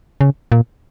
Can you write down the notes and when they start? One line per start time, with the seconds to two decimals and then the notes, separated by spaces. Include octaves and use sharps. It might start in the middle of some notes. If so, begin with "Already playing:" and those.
0.21 C#3
0.52 A#2